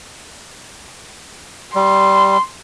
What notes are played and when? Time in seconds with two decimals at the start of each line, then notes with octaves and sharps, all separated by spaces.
1.75 G3 C6